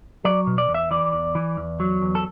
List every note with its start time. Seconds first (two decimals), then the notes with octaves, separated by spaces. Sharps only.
0.25 F#3 D5
0.47 B2
0.58 D5
0.69 E2
0.74 E5
0.91 E3 D5
1.13 E2
1.35 E3
1.57 E2
1.80 F#3
2.02 E2
2.15 A4